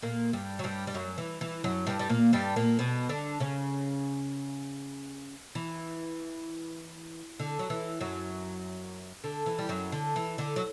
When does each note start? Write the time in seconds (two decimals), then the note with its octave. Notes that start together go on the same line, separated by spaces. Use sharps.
0.02 A#2 A#3
0.33 G2 G3
0.59 F#3
0.64 G2 G3
0.87 G3
0.94 F#2 F#3
1.18 E3
1.41 E3
1.64 F#2 F#3
1.87 G2 G3
1.99 G3
2.09 A#2 A#3
2.33 G2 G3
2.56 A#2 A#3
2.79 B2 B3
3.09 D3 D4
3.40 C#3 C#4
5.55 E3
7.39 D3
7.59 F#3
7.70 E3
8.01 F#2 F#3
9.24 D3
9.46 E3
9.59 G3
9.69 F#2 F#3
9.92 D3
10.16 E3
10.38 D3
10.56 F#3